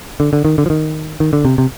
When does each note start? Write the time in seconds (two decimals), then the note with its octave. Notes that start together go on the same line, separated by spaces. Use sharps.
0.20 D3
0.33 D3
0.45 D#3
0.58 D3
0.66 F3
0.70 D#3
1.20 D#3
1.33 D3
1.45 C3
1.58 C3